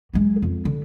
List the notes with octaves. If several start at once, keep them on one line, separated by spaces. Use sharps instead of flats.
F#3 G#3
F2
D3